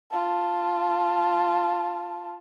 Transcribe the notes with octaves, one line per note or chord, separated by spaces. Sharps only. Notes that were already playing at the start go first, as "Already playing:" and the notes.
F4 A5